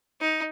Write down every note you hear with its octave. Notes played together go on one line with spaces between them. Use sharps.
D#4